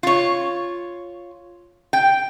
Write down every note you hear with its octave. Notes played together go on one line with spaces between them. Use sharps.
F4 C#5
G5